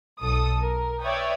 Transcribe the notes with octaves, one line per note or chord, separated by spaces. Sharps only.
B1 A4 D#6
A#4
B4 C#5 D5 E5 G5 D#6